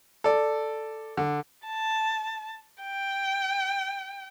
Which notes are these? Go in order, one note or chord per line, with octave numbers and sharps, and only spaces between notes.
A4 D5
D3
A5
G5